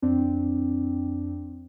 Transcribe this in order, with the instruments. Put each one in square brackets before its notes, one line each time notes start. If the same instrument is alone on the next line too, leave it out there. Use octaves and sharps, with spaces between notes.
[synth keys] F2 C4 D4